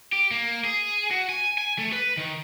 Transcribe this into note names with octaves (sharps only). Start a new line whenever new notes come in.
G4
A#3
G#4
F#4
G#5
G#5
A3
B4
D#3